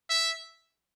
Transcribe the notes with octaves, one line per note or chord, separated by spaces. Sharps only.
E5